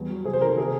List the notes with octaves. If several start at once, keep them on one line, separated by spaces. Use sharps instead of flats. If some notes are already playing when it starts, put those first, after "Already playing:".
Already playing: E2 G3
F#3
C3 G#4
C5
D#3 A#4
A4
C3 G#4